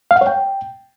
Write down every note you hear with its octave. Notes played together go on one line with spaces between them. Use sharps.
F5
F#5
C#5
G5